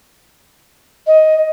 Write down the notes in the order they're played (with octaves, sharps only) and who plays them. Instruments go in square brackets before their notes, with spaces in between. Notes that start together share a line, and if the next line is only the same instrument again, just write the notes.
[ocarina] D#5